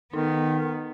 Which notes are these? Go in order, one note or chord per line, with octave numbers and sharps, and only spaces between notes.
D#3 B3 D#4